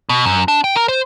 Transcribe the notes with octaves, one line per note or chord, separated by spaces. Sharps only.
B2
F#2
D4
G5
A#4
C5